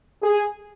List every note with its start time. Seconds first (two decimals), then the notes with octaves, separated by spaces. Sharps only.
0.22 G#4